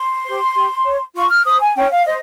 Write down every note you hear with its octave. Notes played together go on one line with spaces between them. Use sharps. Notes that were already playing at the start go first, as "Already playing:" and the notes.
Already playing: C6
G4 C5
G4
C#5
F4 C#6
F6
C5 D#6
G#5
C#4 G5
F5
C5 D#5